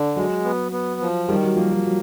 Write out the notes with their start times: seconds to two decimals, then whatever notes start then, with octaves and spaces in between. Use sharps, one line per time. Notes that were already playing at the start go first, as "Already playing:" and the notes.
Already playing: D3
0.16 F#3 G#3
0.44 B3
0.72 B3
1.01 F3
1.28 D#3 G3
1.43 F#3
1.56 F3 A#3
1.71 F#3
1.85 F#3